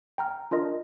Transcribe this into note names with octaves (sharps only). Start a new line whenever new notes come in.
G5 A#5 F6
D4 F4 A#4 D#5